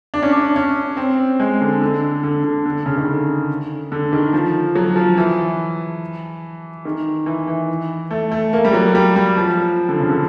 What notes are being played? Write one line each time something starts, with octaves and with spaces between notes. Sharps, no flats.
D4
C#4
D4
C#4
C4
G#3
D3
D3
D3
D3
D3
C#3
D#3
D3
D3
D#3
F3
F#3
F3
E3
D#3
E3
E3
A3
A3
A#3
G3
F#3
G3
G3
F3
D3
C#3
D3